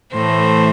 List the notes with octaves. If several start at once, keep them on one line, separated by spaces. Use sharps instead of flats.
A2 E3 A3 C5